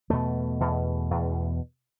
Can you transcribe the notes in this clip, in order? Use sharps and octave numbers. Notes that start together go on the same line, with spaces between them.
E2 B2 A3
E2 B2
E2 B2